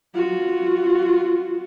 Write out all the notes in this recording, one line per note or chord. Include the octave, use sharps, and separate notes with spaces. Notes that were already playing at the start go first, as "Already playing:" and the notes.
F4 F#4